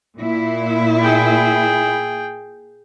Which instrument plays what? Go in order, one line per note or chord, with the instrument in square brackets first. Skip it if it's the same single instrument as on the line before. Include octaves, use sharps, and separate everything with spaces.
[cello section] A#2 E4
[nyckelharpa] G#4 G5